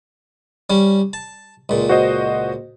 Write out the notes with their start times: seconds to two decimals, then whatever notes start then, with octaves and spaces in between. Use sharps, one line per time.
0.70 G3 C#4
1.13 A5
1.69 C#2 A#2
1.89 F#4 C5 D#5